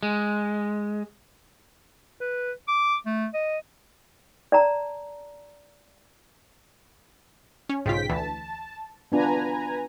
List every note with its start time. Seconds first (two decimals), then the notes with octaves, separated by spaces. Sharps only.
0.03 G#3
2.21 B4
2.68 D6
3.06 A3
3.34 D#5
4.52 D5 A5 A#5
7.69 C#4
7.86 B1 G#2 C#3 F4 G5 B6
8.09 D2 E3 A5
9.12 B3 D4 F4 B4 G#5 A#5